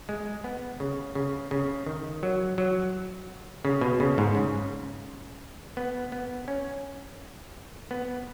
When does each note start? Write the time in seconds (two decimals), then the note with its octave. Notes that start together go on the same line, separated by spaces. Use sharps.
0.09 G#3
0.44 B3
0.80 C#3
1.15 C#3
1.51 C#3
1.86 D#3
2.23 F#3
2.58 F#3
3.65 C#3
3.81 B2
4.00 C#3
4.18 G#2
4.35 C#3
5.77 B3
6.12 B3
6.48 C#4
7.91 B3